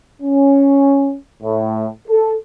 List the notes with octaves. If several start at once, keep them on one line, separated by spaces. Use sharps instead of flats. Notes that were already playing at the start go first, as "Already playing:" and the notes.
C#4
A2
A4